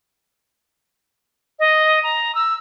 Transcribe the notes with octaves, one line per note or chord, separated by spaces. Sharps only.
D#5
A#5
E6